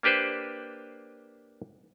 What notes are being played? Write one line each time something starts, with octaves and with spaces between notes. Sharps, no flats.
A#3 D4 G4 B4 C5